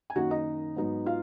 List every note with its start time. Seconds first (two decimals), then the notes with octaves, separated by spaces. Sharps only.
0.10 G#5
0.16 F#2 D#3 A#3 D#4 F#4 F#5
0.31 D#4 D#5
0.76 G#2 F#3 B3 D#4
1.06 F4 F5